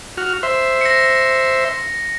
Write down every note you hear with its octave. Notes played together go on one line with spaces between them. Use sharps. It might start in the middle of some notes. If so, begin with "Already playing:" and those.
F#4 F6
C5 E5
A#6 C#7